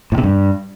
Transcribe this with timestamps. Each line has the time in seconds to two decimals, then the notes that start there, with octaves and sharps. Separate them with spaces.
0.12 A2
0.18 C3
0.24 G2